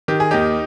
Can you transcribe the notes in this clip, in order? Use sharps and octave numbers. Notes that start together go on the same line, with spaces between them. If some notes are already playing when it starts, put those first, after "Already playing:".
D#3 G4
G#4
D#2 D#4 G4